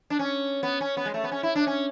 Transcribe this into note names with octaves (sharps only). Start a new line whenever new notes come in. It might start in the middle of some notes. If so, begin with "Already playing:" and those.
D4
C#4
B3
C#4
B3
G#3
A3
B3
C#4
E4
D4
C#4